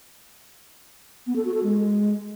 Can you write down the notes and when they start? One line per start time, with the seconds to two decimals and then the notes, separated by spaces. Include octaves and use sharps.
1.27 B3
1.36 A4
1.45 F#4
1.54 A4
1.63 G#3